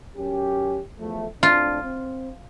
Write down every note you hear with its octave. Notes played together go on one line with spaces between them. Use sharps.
F#2 C#4 G4
E2 F3 A3
A2 C4 D4 F4
C4